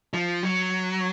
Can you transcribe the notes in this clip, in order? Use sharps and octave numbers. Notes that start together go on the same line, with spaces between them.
F3
F#3